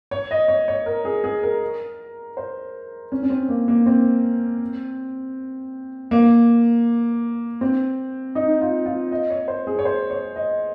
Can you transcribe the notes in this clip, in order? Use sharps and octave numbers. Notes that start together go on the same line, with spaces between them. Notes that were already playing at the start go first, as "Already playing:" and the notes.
C#5
D#5
C#5
C#5
A#4
G#4
G#4
A#4
C5
C#4
C#4
C4
A#3
A#3
C4
A#3
C4
D#4
F4
F4
D#5
C#5
C5
G#4
C#5
C5
C#5
D#5